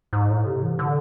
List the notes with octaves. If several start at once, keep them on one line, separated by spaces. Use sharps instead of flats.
G#2
A2
C3
E3
D3